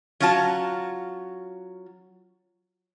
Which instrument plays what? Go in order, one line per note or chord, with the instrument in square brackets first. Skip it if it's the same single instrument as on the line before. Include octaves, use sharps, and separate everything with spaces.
[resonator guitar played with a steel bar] F#3 C#4 F4 F#4 A5